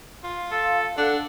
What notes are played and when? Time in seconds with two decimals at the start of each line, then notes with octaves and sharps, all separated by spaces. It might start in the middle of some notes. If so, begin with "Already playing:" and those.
0.24 F4
0.51 A4 F5
0.98 D4 A4 F#5